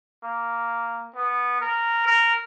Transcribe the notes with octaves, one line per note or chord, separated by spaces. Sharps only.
A#3
B3
A#4
A#4